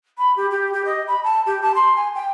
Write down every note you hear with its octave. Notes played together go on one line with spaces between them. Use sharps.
B5
G4
G4
G4
D#5
B5
A5
G4
A5
C6
G#5
G5